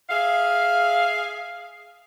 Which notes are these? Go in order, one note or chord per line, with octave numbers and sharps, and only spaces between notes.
G#4 E5 F5